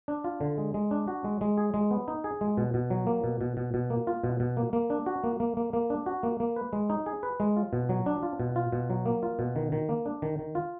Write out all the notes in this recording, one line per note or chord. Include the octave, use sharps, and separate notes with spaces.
D4
F4
D3
G#3
G#3
D4
F#4
G#3
G#3
G#4
G#3
B3
D#4
G#4
G#3
B2
B2
F#3
A#3
B2
B2
B2
B2
A#3
F4
B2
B2
A#3
A#3
D4
F#4
A#3
A#3
A#3
A#3
D4
F#4
A#3
A#3
B4
G#3
D#4
G#4
B4
G#3
F4
B2
F#3
D4
F4
B2
F4
B2
F#3
A#3
F4
B2
D#3
D#3
A#3
D4
D#3
D#3
F4